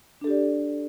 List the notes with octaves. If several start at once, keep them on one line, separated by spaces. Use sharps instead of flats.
D4 G4 A4 D5